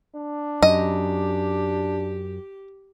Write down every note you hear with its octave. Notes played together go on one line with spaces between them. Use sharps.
D4
F#2 G4 D#5